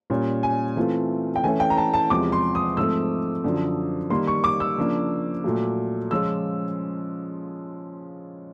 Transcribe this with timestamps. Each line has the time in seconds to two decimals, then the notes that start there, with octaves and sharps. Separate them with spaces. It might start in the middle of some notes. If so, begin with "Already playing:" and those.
0.10 A#2 G3 A#3 C#4
0.43 G#5
0.76 E3 A3 C4 F4
1.36 G5
1.44 E3 A3 C#4 E4 G#5
1.60 G5
1.70 A#5
1.77 A5
1.94 A5
2.10 E2 C3 F3 G#3 D6
2.32 C6
2.55 D#6
2.77 G#2 F3 A3 C4 E6
3.44 F#2 D3 F3
4.10 D#3 G3 A#3 C6
4.27 C#6
4.44 D6
4.60 E6
4.77 C#3 F3 A#3 D4
5.44 A#2 F#3 A3
6.11 C#3 F3 G#3 C#4 F4 E6